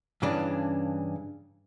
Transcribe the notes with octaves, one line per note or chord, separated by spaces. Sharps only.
G2 C#3 E3 C#4 D4